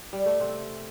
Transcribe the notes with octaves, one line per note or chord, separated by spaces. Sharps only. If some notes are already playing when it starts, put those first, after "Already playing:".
G3
A3
C3 C4